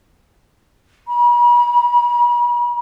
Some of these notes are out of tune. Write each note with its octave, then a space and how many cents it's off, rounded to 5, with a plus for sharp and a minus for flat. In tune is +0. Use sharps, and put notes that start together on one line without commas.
B5 -45